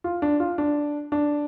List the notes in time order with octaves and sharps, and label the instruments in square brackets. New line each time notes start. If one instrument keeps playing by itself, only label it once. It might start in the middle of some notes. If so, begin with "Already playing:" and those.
[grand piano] F4
D4
F4
D4
D4